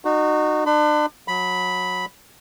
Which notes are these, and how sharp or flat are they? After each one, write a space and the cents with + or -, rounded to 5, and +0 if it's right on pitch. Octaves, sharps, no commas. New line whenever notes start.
D#4 -30 F#4 +0
D4 +35 B5 +40
F#3 -25 B5 +0